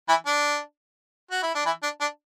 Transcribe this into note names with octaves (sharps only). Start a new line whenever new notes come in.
E3 E4
D4
F#4
E4
D4
E3 E4
D4
D4